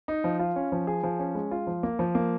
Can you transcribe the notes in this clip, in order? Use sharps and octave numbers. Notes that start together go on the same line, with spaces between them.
D#4
F3
F4
C#4
F3
G#4
F3
C#4
G#3
F4
F3
A#3
F3
A#3